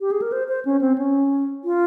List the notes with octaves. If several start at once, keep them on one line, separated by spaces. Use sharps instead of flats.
G4
G#4
A#4
C5
C5
C#4
C4
C#4
F4